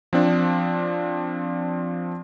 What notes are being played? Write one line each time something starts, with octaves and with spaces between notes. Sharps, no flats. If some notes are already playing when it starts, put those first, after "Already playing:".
F3 C4 D4